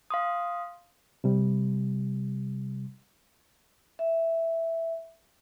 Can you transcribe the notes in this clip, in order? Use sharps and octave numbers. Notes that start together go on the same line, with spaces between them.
F5 C6 D#6
C3 G3
E5